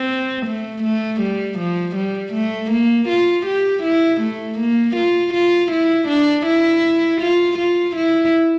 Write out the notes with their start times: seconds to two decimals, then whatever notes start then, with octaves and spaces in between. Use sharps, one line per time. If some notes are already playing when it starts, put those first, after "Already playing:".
Already playing: C4
0.46 A3
0.83 A3
1.21 G3
1.59 F3
1.96 G3
2.33 A3
2.71 A#3
3.08 F4
3.46 G4
3.83 E4
4.21 A3
4.59 A#3
4.96 F4
5.34 F4
5.72 E4
6.08 D4
6.46 E4
7.21 F4
7.58 F4
7.96 E4